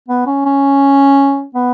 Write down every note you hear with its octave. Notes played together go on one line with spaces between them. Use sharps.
B3
C#4
C#4
B3